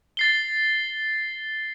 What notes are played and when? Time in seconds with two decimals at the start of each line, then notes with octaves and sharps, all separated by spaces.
0.17 A6 C7 G7